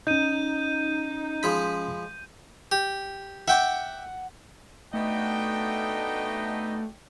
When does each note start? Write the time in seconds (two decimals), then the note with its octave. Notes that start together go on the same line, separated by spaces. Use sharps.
0.07 C#4 D#4 D#5 G6 D#7
1.43 F3 G#3 B5
2.72 G4
3.48 E5 F#5 G5 D6
4.94 A3 B3 D4 D#4 F#4 D#5 G5